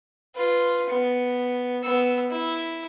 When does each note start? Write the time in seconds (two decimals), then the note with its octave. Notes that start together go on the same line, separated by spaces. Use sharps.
0.36 F4 B4
0.90 B3
1.84 B3 E6
2.31 E4